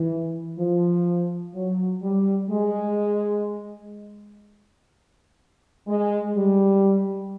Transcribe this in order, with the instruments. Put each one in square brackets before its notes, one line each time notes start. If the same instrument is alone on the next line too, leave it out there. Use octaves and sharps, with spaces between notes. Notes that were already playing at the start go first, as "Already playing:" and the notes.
Already playing: [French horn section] E3
F3
F#3
G3
G#3
G#3
G3